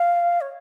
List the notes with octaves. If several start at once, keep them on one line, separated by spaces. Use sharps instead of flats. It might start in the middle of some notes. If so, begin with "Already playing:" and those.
Already playing: F5
C#5